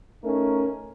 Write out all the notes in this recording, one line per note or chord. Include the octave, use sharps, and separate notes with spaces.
A3 C#4 D#4 A#4